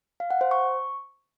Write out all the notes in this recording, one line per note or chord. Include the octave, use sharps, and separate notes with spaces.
F5
F#5
C5
C#6